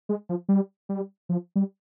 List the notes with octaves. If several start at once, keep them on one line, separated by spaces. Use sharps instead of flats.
G#3
F3
G3
G3
F3
G3